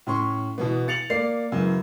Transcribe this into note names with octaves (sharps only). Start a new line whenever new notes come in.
A2 C#4 C6 C#6
B2 E3 B3
A6 C#7 F7 F#7
A#3 D5 C7
F#2 C#3 E3